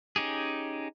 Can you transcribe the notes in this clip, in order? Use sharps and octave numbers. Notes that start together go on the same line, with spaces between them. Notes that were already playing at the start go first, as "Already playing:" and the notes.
C#4 D#4 G4 G#4